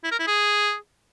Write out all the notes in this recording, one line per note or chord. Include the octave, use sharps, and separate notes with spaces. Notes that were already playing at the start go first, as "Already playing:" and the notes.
E4
A#4
E4
G#4